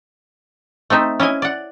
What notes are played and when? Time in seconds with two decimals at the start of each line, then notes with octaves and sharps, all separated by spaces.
0.90 A3 C4 D#4 E5
1.20 C#4 E4 D#5 G#5
1.42 D5 F#5